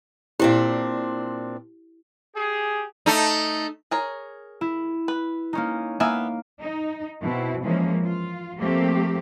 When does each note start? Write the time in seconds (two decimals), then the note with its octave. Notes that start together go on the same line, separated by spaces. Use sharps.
0.40 A#2 C4 D4 E4 G4
2.36 G4 G#4
3.06 A3 D#4
3.91 G#4 A#4 C#5
4.61 E4
5.08 B4
5.53 A#3 C#4 D#4
6.00 A#3 B3 E5 G#5
6.60 D#4
7.21 B2 C4 E4
7.63 E3 F3 G#3 A#3 C#4
8.02 F4
8.59 F3 A3 A#3 C4 G4